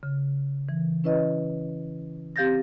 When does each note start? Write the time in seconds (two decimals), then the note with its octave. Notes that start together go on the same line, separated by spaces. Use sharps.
0.03 C#3
0.69 E3
1.04 C#4 E4 B4 C#5 D#5
2.36 C4 G4 F5 G6 A6 A#6